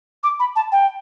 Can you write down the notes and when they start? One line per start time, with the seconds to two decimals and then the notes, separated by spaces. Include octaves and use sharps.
0.23 D6
0.39 B5
0.56 A5
0.72 G5